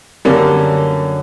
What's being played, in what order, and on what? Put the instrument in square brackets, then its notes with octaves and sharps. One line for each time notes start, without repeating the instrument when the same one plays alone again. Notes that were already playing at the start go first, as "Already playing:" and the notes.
[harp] F#2 D3 [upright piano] G3 A#3 C#4